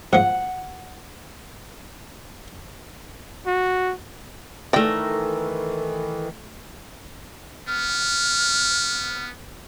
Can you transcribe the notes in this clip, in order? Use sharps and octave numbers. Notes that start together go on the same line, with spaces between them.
G#2 F3 F#5
F#4
D#3 E3 A3 A4 A#4 D5 G5
B3 F6